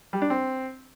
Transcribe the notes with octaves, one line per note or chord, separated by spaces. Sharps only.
G3
D4
C4